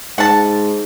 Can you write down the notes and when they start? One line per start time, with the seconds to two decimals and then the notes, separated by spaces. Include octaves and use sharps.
0.18 G#2 F#5 A5